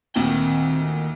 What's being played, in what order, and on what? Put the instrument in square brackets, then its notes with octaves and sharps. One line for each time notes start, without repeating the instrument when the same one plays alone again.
[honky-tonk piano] D2 A#2 [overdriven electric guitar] D#3 G5 [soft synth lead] C4